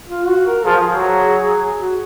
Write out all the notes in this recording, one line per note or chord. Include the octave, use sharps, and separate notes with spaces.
F4
F#4
A#4
F3 G#4
F#3
F#4